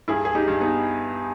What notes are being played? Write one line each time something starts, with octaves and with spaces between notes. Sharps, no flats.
G2 E4 G#4
G#4
D#4 G4
G2
B3 D#4